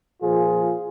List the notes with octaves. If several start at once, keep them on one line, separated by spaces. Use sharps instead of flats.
A#2 F3 F4 G#4